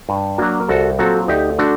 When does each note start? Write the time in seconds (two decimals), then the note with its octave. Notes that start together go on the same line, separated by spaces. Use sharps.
0.09 G2
0.38 F#3 A#3 D4 F#4
0.60 A#4
0.69 C2 F#4 A4
0.99 A#2 F#3 C4 F#4 A4
1.28 D2 D#4 G4
1.59 D3 A3 D4 F#4